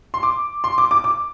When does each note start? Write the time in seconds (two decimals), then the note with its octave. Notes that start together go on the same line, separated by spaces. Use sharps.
0.14 C6
0.23 D6
0.64 C6
0.78 D6
0.91 D6
1.04 D6